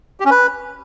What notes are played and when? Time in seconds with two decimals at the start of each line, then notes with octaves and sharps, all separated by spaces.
0.20 G4
0.25 C#4
0.31 B4